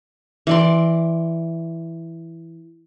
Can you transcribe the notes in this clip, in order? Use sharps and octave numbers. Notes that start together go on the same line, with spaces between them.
E3 D5 C6